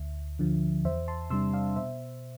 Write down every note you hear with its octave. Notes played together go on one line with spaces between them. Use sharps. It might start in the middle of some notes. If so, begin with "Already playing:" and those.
Already playing: D2 E5
D3 F3
E2 C5 E5
A5 C6
C3 G3 D4 C6 E6
D5 F5
B2 C5 E5